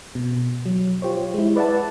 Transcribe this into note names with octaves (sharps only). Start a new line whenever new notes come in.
B2
F#3
F4 G4 C5 C#5
G#3 E4
B4 D5 E5 F#5 A5